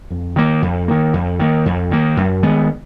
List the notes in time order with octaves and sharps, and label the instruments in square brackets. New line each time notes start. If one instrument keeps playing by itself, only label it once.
[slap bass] F2
D#3 A#3
F2
D#3 A#3
F2
D#3 A#3
F2
D#3 A#3
F#2
D#3 G#3 B3